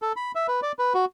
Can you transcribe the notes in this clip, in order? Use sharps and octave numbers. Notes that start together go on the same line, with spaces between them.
A4
B5
E5
B4
D5
B4
F#4